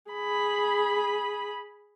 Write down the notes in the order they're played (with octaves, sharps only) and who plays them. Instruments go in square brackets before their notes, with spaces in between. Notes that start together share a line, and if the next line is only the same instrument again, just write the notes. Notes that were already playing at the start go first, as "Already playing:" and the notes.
[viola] G#4 B5